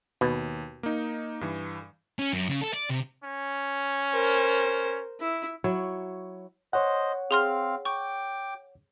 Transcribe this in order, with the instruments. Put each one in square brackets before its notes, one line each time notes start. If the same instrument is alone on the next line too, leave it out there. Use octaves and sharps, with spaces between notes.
[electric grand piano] D#2 [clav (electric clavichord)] B2
[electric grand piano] A#3 D#4
G2 E3
[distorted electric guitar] C#4
F#2
C#3
A4
D5
C3
[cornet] C#4
[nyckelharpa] A#4 C5
E4
[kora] F#3 E4 C#5
[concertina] C5 D#5 [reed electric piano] C#5 F#5
[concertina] C4 F5 [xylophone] G#4 C6 F6
[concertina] G5 D6 [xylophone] C#6